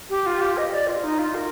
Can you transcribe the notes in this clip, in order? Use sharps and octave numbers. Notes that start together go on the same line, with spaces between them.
G4
F4
G4
D#5
D5
F4
D#4
F4
A#4